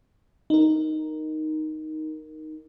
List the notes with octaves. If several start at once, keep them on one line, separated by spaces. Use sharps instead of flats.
D#4 A#4